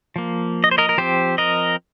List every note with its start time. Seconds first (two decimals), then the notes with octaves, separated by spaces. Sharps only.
0.16 F3 A#3
0.64 D#5
0.71 C5
0.78 A#4 D#5
0.89 A#4
0.98 F3 C4 G4 C5
1.38 A#4 D#5